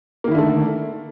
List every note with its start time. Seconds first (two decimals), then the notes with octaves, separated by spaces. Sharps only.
0.24 A#3
0.28 D#3
0.31 E4
0.35 D3
0.38 A3